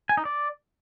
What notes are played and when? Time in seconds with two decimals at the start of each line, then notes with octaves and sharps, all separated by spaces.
0.09 G#5
0.17 D#4
0.25 D5